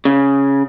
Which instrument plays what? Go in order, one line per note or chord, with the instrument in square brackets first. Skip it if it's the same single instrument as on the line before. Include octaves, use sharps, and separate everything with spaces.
[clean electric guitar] C#3